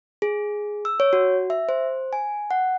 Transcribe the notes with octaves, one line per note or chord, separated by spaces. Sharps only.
G#4
E6
C#5
F#4
E5
C5
G#5
F#5